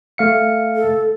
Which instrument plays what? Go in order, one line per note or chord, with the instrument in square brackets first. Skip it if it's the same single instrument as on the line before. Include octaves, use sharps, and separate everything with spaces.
[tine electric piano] A3 F5 C#7
[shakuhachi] A4